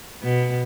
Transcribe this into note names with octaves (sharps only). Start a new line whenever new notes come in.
B2